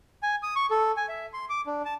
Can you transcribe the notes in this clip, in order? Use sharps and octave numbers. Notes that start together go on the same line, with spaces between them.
G#5
D#6
C#6
A4
G#5
E5
C6
D6
D4
A5